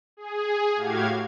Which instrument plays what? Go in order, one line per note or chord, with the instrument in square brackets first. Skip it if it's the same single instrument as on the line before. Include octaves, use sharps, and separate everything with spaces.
[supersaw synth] G#4
A2 F#4 G4 F5 G#6